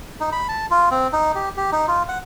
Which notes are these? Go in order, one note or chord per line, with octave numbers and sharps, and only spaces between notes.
D#4
B5
A5
F4
C4
D#4
G4
G4
D#4
F4
F#5